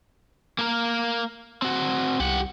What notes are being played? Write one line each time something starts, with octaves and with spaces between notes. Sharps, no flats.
A#3 A#4
C4 F#4
C2 G4 F#5